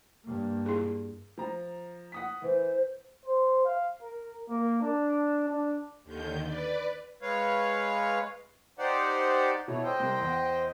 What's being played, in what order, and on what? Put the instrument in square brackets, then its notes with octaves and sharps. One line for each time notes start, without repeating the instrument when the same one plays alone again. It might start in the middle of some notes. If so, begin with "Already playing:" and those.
[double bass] G2 A#3
[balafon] E4 G#4
[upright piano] F3 A#5
F#5 D#6 B6
[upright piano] E3 [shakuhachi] C5
[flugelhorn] C5
F5
A#4
A#3
D4
D4
[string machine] D#2 D3 D#3 G6
B4 D5
[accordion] G#3 B4 C#5 F5
D#4 G4 C5 D5 F#5
[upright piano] B2 [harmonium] E4 C#5
[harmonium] C5 D#5 G5 [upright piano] E6
[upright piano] C2
E2